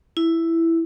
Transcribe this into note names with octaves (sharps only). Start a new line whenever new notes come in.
E4